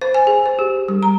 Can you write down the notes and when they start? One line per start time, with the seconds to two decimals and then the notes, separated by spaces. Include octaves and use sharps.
0.01 C5
0.14 G#5
0.27 G#4
0.46 C5
0.59 G4
0.88 G3
1.03 A#5